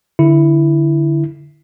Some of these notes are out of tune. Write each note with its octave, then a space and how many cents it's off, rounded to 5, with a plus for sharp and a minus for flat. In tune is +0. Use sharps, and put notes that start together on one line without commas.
D3 +0 E4 +0